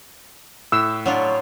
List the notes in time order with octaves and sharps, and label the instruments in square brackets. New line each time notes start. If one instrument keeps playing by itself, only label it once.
[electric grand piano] A2 F#6 [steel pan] E6
[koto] F#3 D4 F4